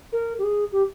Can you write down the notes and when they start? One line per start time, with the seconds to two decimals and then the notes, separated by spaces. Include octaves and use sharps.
0.12 A#4
0.39 G4
0.43 G#4
0.72 G4